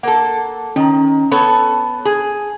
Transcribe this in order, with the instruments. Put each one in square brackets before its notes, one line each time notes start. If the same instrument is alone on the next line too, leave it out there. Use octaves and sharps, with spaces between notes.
[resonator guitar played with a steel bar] A#3 A4 [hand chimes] A#4 F#5
[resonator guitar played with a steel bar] D#3 [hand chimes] C#4 A#5
[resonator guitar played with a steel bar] B3 A4 C#5 [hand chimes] A5
[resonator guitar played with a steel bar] G#4